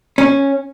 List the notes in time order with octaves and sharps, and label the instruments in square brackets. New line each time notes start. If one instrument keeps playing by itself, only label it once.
[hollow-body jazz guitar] C#4